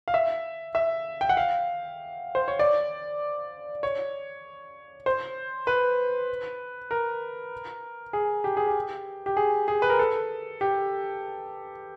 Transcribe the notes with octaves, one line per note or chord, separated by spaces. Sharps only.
F5
E5
E5
G5
F#5
F5
C5
C#5
D5
C#5
C5
B4
A#4
G#4
G4
G#4
G4
G4
G#4
G#4
B4
A#4
A4
G4